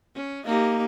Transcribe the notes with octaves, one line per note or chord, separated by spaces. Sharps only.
C#4
A#3 D#4 G4